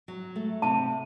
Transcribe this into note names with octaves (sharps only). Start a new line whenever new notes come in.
F#3
A3
C3 A5